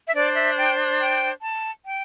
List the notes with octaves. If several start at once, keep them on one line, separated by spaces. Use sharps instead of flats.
E5
D4 C5 D5
E5
G5
G5
A5
G5